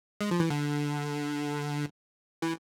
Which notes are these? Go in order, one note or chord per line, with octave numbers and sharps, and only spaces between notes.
G#3
F3
E3
D3
E3